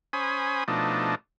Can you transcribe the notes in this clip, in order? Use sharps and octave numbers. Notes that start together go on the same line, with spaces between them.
C#4 C5 G#5 B5 D#6
B2 F3 A3 D4 D#4